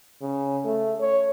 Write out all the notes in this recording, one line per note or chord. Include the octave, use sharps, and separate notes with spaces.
C#3
A3
C#5